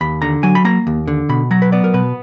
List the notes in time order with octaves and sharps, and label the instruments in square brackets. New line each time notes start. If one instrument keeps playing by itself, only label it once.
[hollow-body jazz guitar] D#2 B5
D3 A#5
F#3 G#5
B5
A#3 A#5
D#2
D3
B2 B5
F#3 A#5
B4
B3 D5
A#4
B2 B4